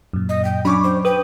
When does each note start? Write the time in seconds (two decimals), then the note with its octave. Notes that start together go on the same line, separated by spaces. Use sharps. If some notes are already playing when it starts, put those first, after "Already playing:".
0.13 F#2 A#2
0.29 D#5
0.45 G5
0.65 F#3 C#4 D4 B5 C#6 D6
0.84 C5
1.05 B4 G5 D#6